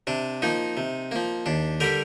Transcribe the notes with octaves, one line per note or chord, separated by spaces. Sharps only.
C3 D4
F3 A#3 D#4
C3
F3 A#3
D#2 D4
D3 G3 G4 A#4